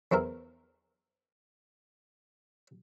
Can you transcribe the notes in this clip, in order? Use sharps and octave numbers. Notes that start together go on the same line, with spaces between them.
E2 C4 E4 A#4